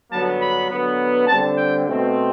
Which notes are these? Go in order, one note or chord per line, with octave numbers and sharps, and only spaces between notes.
G2 D3 F#3 B3 A5
B5
D3 F#3 B3
D3 G3 C4 A5
G5
B2 A3 C4